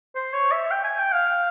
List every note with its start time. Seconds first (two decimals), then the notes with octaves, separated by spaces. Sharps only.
0.15 C5
0.33 C#5
0.51 E5
0.71 G5
0.84 G#5
0.98 G5
1.12 F5